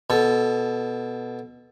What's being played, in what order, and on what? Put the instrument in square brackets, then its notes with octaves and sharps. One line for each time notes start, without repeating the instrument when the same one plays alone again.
[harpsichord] B2 A4